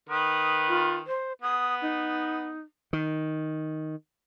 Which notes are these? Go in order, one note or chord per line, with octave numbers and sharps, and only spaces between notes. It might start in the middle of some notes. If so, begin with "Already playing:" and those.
D#3 B4 D#6
F4
C5
B3 D#6
D#4
D#3